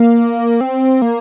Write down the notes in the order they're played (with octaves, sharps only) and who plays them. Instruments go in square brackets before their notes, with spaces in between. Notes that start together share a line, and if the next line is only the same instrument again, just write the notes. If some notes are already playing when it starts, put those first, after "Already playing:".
Already playing: [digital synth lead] A#3
C4
A#3